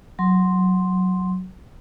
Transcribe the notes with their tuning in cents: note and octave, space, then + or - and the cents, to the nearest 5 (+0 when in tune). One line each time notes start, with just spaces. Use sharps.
F#3 +0 C6 +0